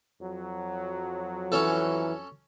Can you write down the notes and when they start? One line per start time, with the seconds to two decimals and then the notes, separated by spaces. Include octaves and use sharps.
0.20 F2 F#3
1.52 E3 C#4 A4